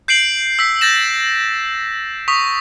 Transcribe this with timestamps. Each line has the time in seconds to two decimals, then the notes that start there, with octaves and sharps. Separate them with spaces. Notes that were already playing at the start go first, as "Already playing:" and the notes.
0.08 G6 C7 D7 F#7
0.59 E6 B6
0.81 G6 A6 A#6 E7
2.28 C#6 D#6 B6